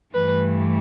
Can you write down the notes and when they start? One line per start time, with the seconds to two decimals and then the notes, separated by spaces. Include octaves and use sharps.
0.13 G2 E3 A3 B4